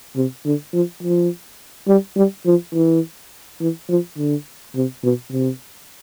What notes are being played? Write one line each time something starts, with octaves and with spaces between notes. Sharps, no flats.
C3
D3
F3
F3
G3
G3
F3
E3
E3
F3
D3
C3
B2
C3